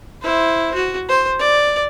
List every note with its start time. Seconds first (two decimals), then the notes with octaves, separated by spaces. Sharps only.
0.22 E4 C5
0.75 F#4
1.09 C5
1.39 D5